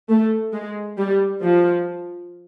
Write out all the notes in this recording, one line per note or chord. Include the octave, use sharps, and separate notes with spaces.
A3
G#3
G3
F3